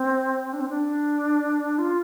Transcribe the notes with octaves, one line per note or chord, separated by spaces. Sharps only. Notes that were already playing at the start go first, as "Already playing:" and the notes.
Already playing: C4
D4
C4
D4
F4